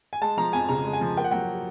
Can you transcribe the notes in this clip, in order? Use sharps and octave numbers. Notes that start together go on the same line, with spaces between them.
G#5
G#3 A5
F3 A#5
F2 G#5
C#3 A#5
G#3
G#5
F3
A#3 G5
F#5
F#3 G5